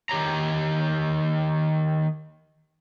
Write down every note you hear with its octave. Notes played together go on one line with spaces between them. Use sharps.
D#3 G4 C#5 A#5